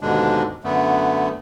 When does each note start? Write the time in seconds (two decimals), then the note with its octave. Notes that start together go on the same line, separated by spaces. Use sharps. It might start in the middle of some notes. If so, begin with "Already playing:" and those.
0.01 D#2 G#2 B2 D3 G#3 D4
0.64 F#2 D3 A3 B3